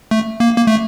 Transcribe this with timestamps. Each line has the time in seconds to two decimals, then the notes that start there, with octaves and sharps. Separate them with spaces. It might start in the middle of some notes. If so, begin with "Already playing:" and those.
0.11 A3
0.40 A#3
0.57 A#3
0.67 A3